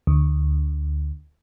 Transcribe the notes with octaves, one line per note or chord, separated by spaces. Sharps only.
D2